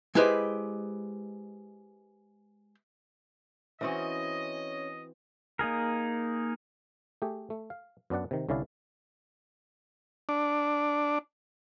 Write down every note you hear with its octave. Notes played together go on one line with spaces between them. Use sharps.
G#3 E4 G4 B4 C5 D#5
E3 C4 C#4 F#4 D#5
A#3 D#4 G#4 A#4
A3 G4 G#4
A3
F5
F#2 B3 D4 D5 F#5
C3 D#3
C2 D3 C#4 E4 D5 F5
D4